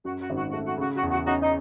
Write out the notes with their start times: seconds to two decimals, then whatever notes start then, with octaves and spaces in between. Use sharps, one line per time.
0.05 F#2 F#4
0.21 F#4
0.30 G#1
0.36 F#4
0.50 F#4
0.53 A3
0.65 F#4
0.77 C#3 F#4
0.96 F#4
1.03 E2
1.11 F#4
1.26 C#4 D#4 F#4
1.42 D#4